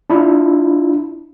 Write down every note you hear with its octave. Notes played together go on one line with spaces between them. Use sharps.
D4 E4 F4